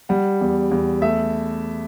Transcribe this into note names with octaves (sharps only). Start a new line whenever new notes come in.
G3 F#5
E2
E2
A3 E5